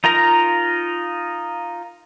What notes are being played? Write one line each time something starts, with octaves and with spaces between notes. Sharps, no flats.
D#4 F4 A#4 A#5